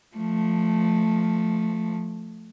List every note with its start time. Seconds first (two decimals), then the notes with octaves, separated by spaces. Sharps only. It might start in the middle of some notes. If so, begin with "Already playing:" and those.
0.16 F3 A3